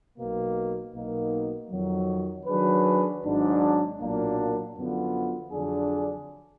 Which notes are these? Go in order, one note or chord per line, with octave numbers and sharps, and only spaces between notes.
B1 B2 A#3
B1 B2 A#3 D#4
F2 D#3 F#3
D#3 F#3 D4 G#4 B4
G#1 G#2 F#3 D4
B1 A#2 F#3 A#3 D4
F#2 D3 F3 B3 F4
F2 D3 F#3 D4 G#4